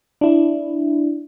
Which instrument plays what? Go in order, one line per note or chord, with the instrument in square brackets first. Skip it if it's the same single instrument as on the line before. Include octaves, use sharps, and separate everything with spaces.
[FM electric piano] D4 E4